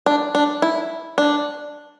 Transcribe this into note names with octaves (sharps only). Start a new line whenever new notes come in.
D4
D4
E4
D4